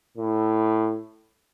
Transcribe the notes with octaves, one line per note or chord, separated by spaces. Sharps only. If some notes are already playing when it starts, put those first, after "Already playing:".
A2